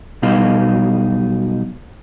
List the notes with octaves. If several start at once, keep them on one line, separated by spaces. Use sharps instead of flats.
B1 B2 G3 B3 D#4 F5